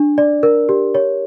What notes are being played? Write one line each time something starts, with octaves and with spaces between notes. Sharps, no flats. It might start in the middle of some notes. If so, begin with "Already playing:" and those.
Already playing: D4
D5
A#4
G4
C#5